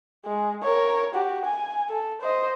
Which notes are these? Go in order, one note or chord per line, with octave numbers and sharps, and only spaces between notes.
G#3
A#4 C#5
F#4 G4
G#5
A4
C5 D#5